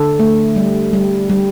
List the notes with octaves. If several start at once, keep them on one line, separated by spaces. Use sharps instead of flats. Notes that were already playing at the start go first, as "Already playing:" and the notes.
Already playing: D3 A4
A3
G3
G3
G3